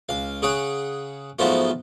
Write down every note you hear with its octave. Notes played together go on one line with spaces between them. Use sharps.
C#2 F5
C#3 G#4 C#5 F#5
G#2 F3 F#3 A3 B3 F4